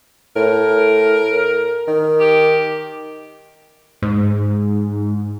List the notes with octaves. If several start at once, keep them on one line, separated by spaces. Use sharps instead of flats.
A2 A#4
D#3
G4
G#2